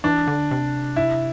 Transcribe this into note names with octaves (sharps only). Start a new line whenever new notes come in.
E3 D4
D3
C3
E4